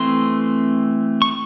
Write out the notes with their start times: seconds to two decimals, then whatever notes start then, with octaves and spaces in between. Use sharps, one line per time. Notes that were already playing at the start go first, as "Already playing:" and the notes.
Already playing: E3 A3 C4 C6
1.22 C#6